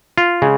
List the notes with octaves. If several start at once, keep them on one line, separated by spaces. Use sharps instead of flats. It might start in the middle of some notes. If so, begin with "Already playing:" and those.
F4
C#3 G#3